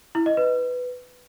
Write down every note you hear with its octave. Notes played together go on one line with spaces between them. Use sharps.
E4
D#5
B4